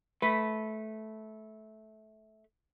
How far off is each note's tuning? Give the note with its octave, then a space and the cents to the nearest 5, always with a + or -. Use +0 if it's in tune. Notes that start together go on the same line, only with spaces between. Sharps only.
A3 -15 B4 +0